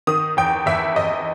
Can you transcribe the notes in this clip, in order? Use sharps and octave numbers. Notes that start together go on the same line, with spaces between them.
D#3 D#6
E2 G5
E2 E5
E2 D#5